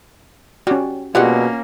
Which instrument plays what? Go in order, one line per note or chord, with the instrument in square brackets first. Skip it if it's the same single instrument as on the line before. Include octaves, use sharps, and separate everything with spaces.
[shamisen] G3 [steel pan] C#4 F#4
[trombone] B2 [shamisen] G3 G#3 C4 [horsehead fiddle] A#3 C#4 [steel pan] F4 F#5